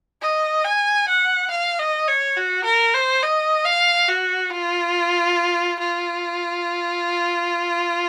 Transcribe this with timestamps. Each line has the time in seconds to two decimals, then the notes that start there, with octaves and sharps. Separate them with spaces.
0.22 D#5
0.65 G#5
1.08 F#5
1.50 F5
1.79 D#5
2.08 C#5
2.37 F#4
2.64 A#4
2.94 C5
3.23 D#5
3.65 F5
4.08 F#4
4.51 F4
5.80 F4